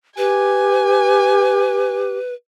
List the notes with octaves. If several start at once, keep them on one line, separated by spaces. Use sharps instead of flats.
G4 B4 G#5